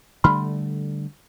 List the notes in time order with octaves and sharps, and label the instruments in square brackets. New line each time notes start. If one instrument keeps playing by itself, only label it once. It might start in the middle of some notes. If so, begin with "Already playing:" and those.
[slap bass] D3 G3 A3 [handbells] B5 C6 F6